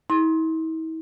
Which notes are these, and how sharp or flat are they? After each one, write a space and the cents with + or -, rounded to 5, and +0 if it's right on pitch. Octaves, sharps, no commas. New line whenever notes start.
E4 -45 C6 +20